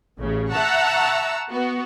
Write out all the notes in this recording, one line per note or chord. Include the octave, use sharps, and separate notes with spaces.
A1 C#3
E5 F#5 A5 A#5 C#6 E6
B3 F#4